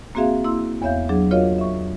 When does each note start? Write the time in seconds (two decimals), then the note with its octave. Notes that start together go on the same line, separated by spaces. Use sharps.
0.15 A#3 C4 F#4 G#4 E5 F5
0.44 A#3 E4 C6 E6
0.82 E2 B3 C#5 E5 F5 G6
1.09 F#3 D4 G#4
1.31 F4 F#4 A#4 C#5 D#5 F5
1.58 E5 C#6